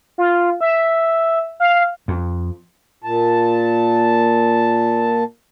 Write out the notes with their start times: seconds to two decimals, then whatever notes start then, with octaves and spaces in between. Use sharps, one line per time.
0.18 F4
0.61 E5
1.60 F5
2.08 F2
3.04 A#2 A5